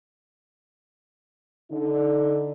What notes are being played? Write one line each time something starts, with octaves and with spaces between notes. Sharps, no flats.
D3 D#4